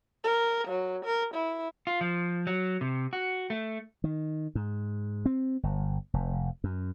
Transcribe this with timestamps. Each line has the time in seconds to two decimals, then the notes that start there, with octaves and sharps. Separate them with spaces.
0.24 A#4
0.67 F#3
1.05 A#4
1.34 E4
1.87 F4
2.01 F3
2.47 F#3
2.81 C3
3.13 F#4
3.50 A3
4.04 D#3
4.55 G#2
5.26 C4
5.63 G1
6.14 F1
6.64 F#2